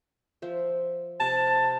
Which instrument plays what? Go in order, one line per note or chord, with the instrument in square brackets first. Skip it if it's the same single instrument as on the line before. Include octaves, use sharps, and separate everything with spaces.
[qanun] F3 C5 E5
[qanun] C3 [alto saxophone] A5